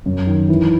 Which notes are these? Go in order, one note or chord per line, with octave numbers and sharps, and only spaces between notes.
F#2
D#3
E3